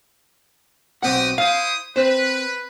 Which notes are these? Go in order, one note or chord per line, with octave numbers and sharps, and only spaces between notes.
B1 C4 F#4 G4 F#5 D#6
E4 C5 F5 D#6
C4 B4 C5